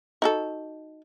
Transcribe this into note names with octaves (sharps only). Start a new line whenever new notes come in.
D#4 F#4 A4